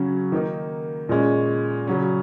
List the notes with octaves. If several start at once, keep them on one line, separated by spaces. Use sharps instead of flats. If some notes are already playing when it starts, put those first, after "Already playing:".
Already playing: C#3 F#3 C#4
D#3 A#3 D#4
A#2 G#3 C#4
C#3 F#3 C#4